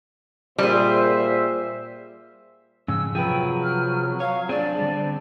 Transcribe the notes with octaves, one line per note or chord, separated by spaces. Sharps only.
A#2 G3 G#4 C5 E5
F2 G#2 C#3 E6
C3 F3 F#3 G#4 B4 G5
F6
C#5 F5
C4 D4 G#4 D5
D3 G3